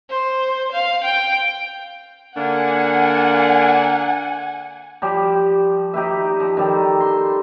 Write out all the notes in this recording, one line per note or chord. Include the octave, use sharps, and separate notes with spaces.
C5
F5
G5
D3 A#3 D4 F#5 G#5
F3 G3 G4
D#4 G4 B4 E5
F3
D#3 G3 A4
C6